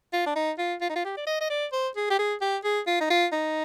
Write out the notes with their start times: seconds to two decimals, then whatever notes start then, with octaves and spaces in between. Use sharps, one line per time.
0.13 F4
0.26 D4
0.36 D#4
0.59 F4
0.81 F4
0.89 D#4
0.96 F4
1.05 G4
1.17 D5
1.27 D#5
1.41 D#5
1.50 D5
1.72 C5
1.96 G#4
2.10 G4
2.19 G#4
2.41 G4
2.64 G#4
2.87 F4
3.00 D#4
3.10 F4
3.33 D#4